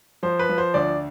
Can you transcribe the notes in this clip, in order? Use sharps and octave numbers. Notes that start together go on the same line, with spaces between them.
F3 C5
B4
F3
C5
D2 D5